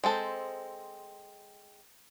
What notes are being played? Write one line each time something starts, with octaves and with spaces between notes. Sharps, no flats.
G#3 C4 A4 C5